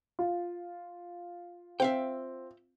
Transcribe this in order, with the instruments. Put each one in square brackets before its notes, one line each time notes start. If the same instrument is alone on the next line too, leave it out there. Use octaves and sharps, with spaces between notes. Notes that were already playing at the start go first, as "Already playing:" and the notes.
[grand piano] F4
[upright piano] C4 [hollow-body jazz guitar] E5 F5 G5